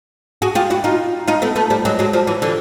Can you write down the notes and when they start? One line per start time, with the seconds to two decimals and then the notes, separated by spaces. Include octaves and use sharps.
0.42 F#4 G#4
0.55 F4 G4
0.70 E4 F#4
0.84 D#4 F4
1.28 D#4 F4
1.42 A3 B3
1.56 A3 B3
1.70 F3 G3
1.85 F#3 G#3
1.99 F#3 G#3
2.13 F3 G3
2.27 E3 F#3
2.42 D3 E3